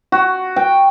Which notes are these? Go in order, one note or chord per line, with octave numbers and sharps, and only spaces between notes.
F#4
G5